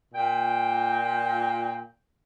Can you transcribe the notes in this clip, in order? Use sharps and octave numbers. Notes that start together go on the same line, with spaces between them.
A#2 G5